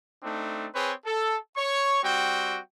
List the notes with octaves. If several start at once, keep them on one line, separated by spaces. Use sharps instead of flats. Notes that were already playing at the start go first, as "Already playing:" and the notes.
A3 C4 D4 D#4
C4 G#4 B4 C#5
A4
C#5 C#6
G3 C4 F#4 G5